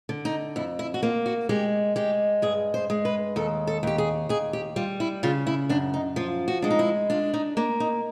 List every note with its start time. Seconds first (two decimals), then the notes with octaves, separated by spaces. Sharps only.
0.09 D3
0.25 D#4
0.56 F2 E4
0.79 E4
0.94 F#4
1.03 A#3 F4
1.26 F#4
1.49 G#3 G4
1.96 G#3 G4
2.42 G2 G#4
2.74 C5
2.90 G#3
3.05 B4
3.36 D#2 A4
3.67 A4
3.83 D#2 G4
3.98 G#4
4.29 D#2 G#4
4.53 G4
4.76 G3 F4
5.00 E4
5.23 C#3 F4
5.47 E4
5.69 F#2 D4
5.94 D#4
6.16 F3 F4
6.48 F#4
6.62 G#3 D4
6.70 D#4
6.79 E4
7.10 D4 F4
7.34 D#4
7.57 A#3 D4
7.80 D#4